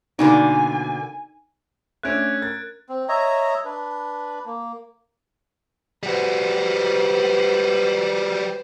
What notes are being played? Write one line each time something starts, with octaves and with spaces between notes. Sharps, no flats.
B2 D3 A#3 D#4 G#5
A3 C#4 D4 F#6 G#6 D7
A#4 A6
C4
C#5 D#5 E5 A#5
D4 B4
A#3
G3 F#4 B4 C5